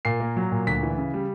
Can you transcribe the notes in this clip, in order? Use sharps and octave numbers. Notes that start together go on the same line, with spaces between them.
A#2 C7
A#3
F#3
A#2
D2 B6
E3
C#3
G3